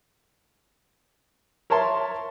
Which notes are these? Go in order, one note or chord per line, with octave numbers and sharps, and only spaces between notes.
A#4 C#5 E5 A5 C6